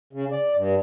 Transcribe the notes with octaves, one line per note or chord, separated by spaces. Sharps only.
C#3
D5
G2